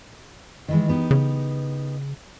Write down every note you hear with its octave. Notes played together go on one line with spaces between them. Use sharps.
D#3 E3 G#3
B3 D#4 G4
C#3